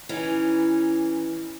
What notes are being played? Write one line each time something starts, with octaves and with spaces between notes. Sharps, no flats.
E3 C#4 D#4